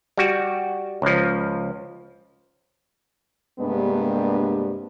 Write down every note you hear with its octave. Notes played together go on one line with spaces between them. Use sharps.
G3 F#4
C#2 F3
G2 C3 G#3 A#3 B3 D4